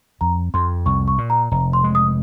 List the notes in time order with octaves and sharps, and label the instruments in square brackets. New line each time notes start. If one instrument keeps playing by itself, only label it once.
[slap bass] F2 [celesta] A#5
[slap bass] F2 [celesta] C6
[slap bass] C2 [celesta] C#6
[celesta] C#6
[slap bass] A#2
[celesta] A#5
[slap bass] F1 [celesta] A#5
[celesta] C6
[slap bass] G#3
[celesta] D#6